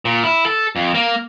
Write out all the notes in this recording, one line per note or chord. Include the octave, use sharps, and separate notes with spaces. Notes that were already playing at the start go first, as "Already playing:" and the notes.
A#2
E4
A4
F2
A#3